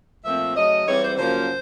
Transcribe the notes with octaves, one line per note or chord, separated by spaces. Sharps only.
A#2 F3 A3 C4 E5
C#3 F#3 A3 D#5
G#2 E3 G3 C4 C#5
C5
F#2 C#3 F3 A#3 C5